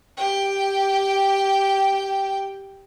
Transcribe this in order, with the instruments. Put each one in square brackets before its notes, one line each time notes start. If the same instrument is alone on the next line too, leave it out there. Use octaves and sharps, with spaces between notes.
[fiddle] G4 G5